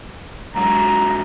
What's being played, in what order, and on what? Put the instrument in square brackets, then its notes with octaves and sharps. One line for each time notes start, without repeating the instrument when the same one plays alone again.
[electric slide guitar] G#2 F#3 [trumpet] A#5